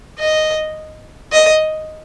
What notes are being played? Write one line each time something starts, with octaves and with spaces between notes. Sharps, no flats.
D#5
D#5